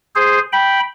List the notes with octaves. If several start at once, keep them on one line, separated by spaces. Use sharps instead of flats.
G#4 C5
G5 B5